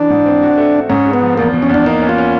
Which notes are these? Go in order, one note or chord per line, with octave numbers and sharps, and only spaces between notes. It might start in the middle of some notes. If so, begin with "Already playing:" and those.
Already playing: E3 D4
G#2
C4
F#4
A3
A3
G#2 C#4
G#3
B3
F3
E2 A#3
B2
C#4
E2
D4
A#3 D#4
C#4
F4
C#4